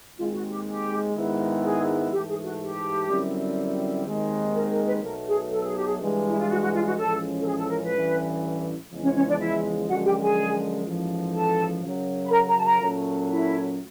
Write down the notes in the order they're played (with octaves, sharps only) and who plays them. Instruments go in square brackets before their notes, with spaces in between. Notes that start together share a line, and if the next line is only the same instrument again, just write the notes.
[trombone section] D#2 D#3 G#3 C4 [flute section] F4
[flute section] F#4
G4
G4
[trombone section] G#2 D#3 G#3 B3 E4
[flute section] G#4
[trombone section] G#2 E3 A3 [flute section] G4
[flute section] G#4
F#4
G4
[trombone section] F#2 D3 G3 C4 E4
D#2 D#3 G#3 C4
[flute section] A#4
A#4
B4
[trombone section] B1 B2 F#3 A3 [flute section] A#4
[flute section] G#4
A4
G#4
G4
G#4
[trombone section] G2 E3 G#3
[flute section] E4
F4
F#4
F#4
F4
F#4
[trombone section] A1 A2 F3 G#3 C#4 [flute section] A4
[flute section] A4
G#4
A4
A#4
B4
[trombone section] A1 G2 E3
E2 C#3 F3 G#3
[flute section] C#4 C#5
C#4 C#5
D4 D5
E4 E5
[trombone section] F#2 D3 F3 G#3 [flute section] F#4 F#5
[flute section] G4 G5
G#4 G#5
[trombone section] A1 G#2 F3
[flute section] A4 A5
[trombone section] F#2 C#3 F#3
[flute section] B5
A#4 A#5
A#4 A#5
A5
A#4 A#5
[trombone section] A#2 F#3 A3 C#4
[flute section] E4 E5